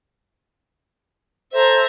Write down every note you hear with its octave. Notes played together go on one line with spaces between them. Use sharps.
A4 C5 E5 A#5